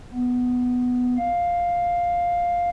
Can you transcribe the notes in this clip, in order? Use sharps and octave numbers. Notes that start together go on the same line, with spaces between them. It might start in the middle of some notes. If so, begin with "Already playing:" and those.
B3
F5